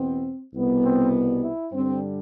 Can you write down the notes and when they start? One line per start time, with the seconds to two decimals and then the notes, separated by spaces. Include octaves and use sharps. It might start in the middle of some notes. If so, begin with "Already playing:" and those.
Already playing: E2 B2 B3 C4
0.54 C2 B2 G3 B3
0.84 C4
1.43 E4
1.72 G2 D3 G3 C4